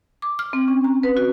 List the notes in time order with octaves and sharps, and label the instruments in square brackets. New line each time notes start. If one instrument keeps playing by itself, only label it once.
[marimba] D6
F6
C4
C#4
A#5
B4
F#4